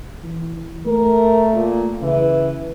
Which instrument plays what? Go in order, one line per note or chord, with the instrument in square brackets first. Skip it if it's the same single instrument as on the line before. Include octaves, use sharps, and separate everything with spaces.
[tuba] E3
[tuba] A3 [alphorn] A#4
[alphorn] A#2
[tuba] C#3 [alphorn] E3